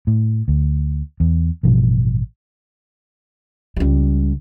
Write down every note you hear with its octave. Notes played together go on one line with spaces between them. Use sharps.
A2
D2
E2
A1 G2 B2 F3
C#2 G3